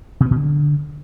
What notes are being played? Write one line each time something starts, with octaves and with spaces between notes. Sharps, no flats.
B2
B3
B2
D3